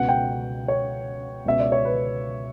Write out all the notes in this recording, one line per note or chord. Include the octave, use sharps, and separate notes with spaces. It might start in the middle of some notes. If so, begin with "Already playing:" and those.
Already playing: C#2 B2 F#5
G5
C#5
C#2 B2 E5
D5
C#5
B4